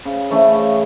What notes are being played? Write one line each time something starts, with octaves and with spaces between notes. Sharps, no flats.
C#3
E3 A3 C#4
C#3